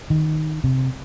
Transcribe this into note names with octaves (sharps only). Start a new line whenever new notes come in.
D#3
C3